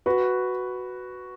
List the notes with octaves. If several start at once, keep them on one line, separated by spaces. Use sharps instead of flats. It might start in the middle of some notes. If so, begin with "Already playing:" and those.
F#4 B4